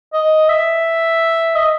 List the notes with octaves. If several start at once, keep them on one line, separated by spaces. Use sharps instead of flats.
D#5
E5
D#5